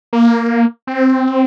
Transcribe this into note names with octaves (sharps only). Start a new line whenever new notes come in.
A#3
C4